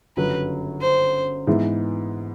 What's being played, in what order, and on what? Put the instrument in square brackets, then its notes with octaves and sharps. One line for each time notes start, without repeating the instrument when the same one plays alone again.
[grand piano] G1 F#2 C#3 F#3 [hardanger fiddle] B4
[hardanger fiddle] C5
[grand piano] G#2 E3 G#3 B3 E4